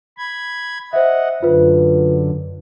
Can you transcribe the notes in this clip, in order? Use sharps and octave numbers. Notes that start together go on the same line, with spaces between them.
B5 G#6
C5 D#5 E5 F#5
F#2 D3 F4 B4